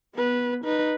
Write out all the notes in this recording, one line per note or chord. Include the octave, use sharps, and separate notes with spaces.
B3 B4
D#4 B4